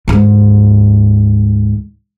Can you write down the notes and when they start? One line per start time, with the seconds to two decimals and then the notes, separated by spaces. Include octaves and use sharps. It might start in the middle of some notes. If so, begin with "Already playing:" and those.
0.08 D2 G#2